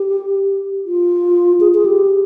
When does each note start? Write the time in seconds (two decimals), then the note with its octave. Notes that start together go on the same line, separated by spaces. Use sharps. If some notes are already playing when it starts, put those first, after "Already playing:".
Already playing: G4
0.86 F4
1.60 G#4
1.74 G#4
1.85 G4